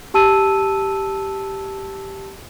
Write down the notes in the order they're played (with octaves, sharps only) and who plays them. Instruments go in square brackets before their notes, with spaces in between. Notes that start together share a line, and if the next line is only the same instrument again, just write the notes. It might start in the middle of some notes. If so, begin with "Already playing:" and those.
[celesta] G4 A5 E6 D#7